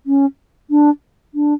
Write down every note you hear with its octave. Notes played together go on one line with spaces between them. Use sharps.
C#4
D4
D4